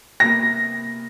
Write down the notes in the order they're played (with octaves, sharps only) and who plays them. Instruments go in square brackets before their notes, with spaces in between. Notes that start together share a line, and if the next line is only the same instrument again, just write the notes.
[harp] C3 A#3 B3 [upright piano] A#6